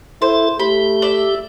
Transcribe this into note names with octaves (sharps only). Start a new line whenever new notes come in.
E4 A4 C5
A3 G4 B5
D5 E5